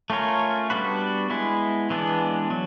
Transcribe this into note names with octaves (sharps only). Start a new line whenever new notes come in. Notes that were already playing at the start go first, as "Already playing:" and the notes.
A3 C#4 F4 A#4 C#5
G3 B3 D4 F#4 B4
G#3 B3 E4
E3 G#3 B3 D4
F#3